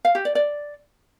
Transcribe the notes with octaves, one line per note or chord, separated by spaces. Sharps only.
F5
G4
D5
D5